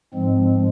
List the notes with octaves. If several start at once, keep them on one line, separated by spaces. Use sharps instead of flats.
G#2 F3 G#3 C4